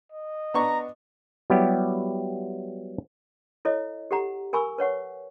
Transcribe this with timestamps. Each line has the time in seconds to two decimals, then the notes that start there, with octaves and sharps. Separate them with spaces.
0.12 D#5
0.54 B3 D4 A#5 C#6
1.50 F#3 G3 B3 E4 G4
3.65 E4 A4 C#5 D#5
4.11 G4 A4 F#5 A#5
4.53 A#4 G#5 B5 C#6 E6
4.78 B4 C#5 F#5 C#6